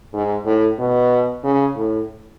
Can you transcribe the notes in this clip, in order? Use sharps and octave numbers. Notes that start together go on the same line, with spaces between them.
G#2
A2
B2
C#3
A2